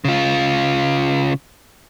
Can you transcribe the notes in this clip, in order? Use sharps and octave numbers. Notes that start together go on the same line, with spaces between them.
C#3 F4